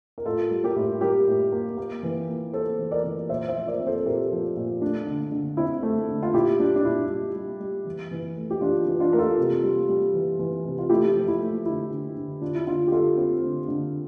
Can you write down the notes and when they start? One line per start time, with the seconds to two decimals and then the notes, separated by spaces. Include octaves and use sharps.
0.18 A#4
0.25 A2 F4 A4
0.51 G3
0.64 G4 A#4
0.76 A2
1.01 G3 G4 A#4
1.27 A2
1.52 A#3
1.77 A#3
2.03 E3
2.29 A#3
2.53 A#3 A4 C5
2.79 E3
2.91 A#4 D5
3.04 E3
3.29 A#2 C5 E5
3.48 C5 E5
3.56 F3
3.67 A#4 D5
3.80 C4
3.87 A4 C5
4.00 A4
4.06 A#2 G4 A#4
4.32 F3
4.56 A#2
4.82 A3 D4
5.07 D3
5.32 D3
5.57 C4 E4
5.83 A3
6.08 D3
6.23 F4
6.34 A#2 E4 G4
6.59 G3 D4
6.76 D4
6.85 A#2 E4
7.10 G3
7.35 G3
7.60 G3
7.85 E3
8.11 E3
8.37 A3
8.51 G4
8.61 E3 D4 F4
8.87 E3
9.00 D4 F4
9.12 A3 A#4
9.18 F4 A4
9.38 C3
9.63 G3
9.89 G3
10.14 E3
10.39 E3
10.65 C3
10.79 F4
10.89 A3 E4 G4
11.15 F3
11.28 E4
11.40 A3
11.65 D3 E4
11.91 D3
12.16 D3
12.41 D3 D4 F4
12.56 E4
12.67 D3 D4 F4
12.87 G4
12.92 D3 F4 A4
13.17 C4
13.43 D3
13.68 D3